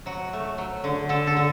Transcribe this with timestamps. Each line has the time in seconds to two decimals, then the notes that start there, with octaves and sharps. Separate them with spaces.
0.06 F#3 F#4
0.33 A3
0.58 F#3
0.84 D3
1.09 D3 A4
1.27 A4
1.37 D3